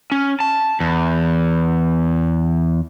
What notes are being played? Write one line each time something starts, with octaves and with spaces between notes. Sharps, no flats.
C#4
A5
E2